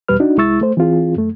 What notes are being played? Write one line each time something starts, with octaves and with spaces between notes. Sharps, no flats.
E2 B2 G3 B4 F6
D4 D#4 F#4
C2 G#3 E4 C#6 E6 A6
A3 C5
E3 C4 F4 G#4
F#2 A3